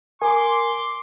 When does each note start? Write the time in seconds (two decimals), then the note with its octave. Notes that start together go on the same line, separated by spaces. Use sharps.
0.22 A#4 G#5 C6 D6